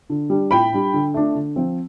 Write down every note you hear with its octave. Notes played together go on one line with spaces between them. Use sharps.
D3
G3 D4
A2 G5 B5
G3 D4
D3
A3 D4
D3
F3 C4